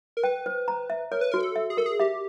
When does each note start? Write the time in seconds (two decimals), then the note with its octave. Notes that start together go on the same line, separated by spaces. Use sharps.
0.17 A#4
0.23 B4 G5
0.46 C5
0.68 A#5
0.90 E5
1.12 A#4 C#5
1.21 B4
1.32 F#4 A#4
1.40 A4
1.56 E5
1.70 G#4
1.77 A4 A#4
1.86 G#4
2.00 G4 E5